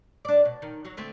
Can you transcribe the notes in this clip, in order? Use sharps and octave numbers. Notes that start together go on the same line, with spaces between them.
D4 D5
B2
D#3
F#3 F#4
D3 A3 C4